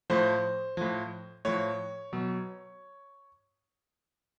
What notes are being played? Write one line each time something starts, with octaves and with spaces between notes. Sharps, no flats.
A2 F3 C5
A2 F3
A2 F3 C#5
B2 F#3